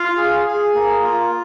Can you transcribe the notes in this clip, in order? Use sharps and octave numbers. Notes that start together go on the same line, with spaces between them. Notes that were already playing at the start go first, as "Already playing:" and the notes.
Already playing: F4 F5
G#4
G#4
A#3
F4